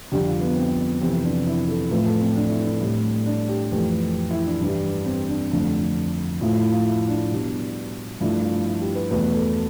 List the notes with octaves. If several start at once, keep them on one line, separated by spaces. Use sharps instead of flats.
F2 D3 G3 G4
F4
B3
C4
F2 C3 E3 C4
D4
E4
A4
A2 F3 A3 B4
A4
C4
D4
E4
D4
A2 G3
D4
G4
F2 E3 A3 G4
E4
D4
G2 E3 G3
C4
D4
F2 D3 A3
A2 F3 A3 E4
E4
F4
E4
D4
B2 G3
G2 F3 A3 E4
F4
E4
G4
B4
E2 B2 A3 B4
A4